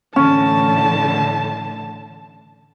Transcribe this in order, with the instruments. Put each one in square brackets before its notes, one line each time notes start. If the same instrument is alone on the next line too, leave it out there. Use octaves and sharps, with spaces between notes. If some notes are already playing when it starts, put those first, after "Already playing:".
[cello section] A2 D3 E3 [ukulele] C#4 [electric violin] A5